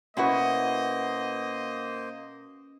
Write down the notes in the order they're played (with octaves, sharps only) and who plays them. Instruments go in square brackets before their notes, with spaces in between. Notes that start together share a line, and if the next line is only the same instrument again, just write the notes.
[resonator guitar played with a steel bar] B2 E4 F#4 [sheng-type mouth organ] A#3 C5 [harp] C#4 B4 [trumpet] D#5